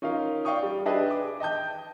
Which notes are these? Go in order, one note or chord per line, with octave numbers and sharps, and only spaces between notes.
C#4 D#4 F4 A#4 F5
D5 F5 G5 C#6 D#6
G3
D4 G4 G#4 B4 D#5 E5
D6
D#5 G5 A5 G6